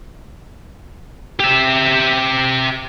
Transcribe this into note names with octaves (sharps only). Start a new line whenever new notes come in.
G4 E5